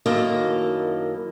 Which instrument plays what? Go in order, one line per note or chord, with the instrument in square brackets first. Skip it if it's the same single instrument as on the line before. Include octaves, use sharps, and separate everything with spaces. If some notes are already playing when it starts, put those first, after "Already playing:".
[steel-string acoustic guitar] F#2 D#3 A#3 E4 A4 D#5